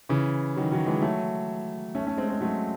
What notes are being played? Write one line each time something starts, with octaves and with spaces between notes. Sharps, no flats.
C#3 E3
D#3 F#3
D#3 F#3
E3 G#3
F#3 A3
A3 C#4
A3 C#4
G#3 C4
G#3 C4
F#3 A3